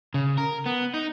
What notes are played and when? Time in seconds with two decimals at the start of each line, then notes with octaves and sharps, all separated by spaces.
0.14 C#3
0.38 A#4
0.66 B3
0.94 D#4